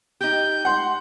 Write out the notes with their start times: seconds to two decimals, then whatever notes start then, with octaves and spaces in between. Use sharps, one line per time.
0.21 D#4 G4 G6
0.65 F#5 C6